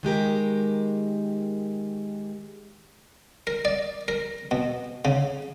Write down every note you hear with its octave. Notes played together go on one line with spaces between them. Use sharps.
D#3 G#3 G4 A#4
A#4
D5
A#4
B2
C#3